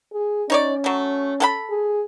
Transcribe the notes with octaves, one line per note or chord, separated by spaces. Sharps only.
G#4
C#4 D#4 C#5 D5
F#3 A3
A4 F#5 B5
G#4